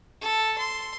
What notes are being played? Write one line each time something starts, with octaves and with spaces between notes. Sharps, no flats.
A4
C6